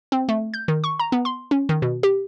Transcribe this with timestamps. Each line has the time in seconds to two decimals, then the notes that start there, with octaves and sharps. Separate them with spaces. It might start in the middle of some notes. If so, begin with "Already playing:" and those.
0.12 C4
0.29 A3
0.54 G6
0.68 D#3
0.84 C#6
0.99 A#5
1.12 B3
1.25 C6
1.51 C#4
1.69 D#3
1.82 B2
2.03 G4